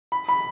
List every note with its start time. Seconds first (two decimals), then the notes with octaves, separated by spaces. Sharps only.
0.12 B5
0.29 B5